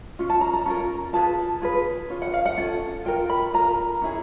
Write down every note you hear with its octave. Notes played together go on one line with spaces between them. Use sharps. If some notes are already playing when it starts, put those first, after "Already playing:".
C#4 F4
A5
A#5
A#5
C#4 F4 A#4
F4 G#4 B4 A5
F4 G#4 B4
C#4 F4
F#5
F5
F#5
C#4 F4 A4
F4 A#4 G5
B5
F4 A#4 A#5
C#4 E4 G#4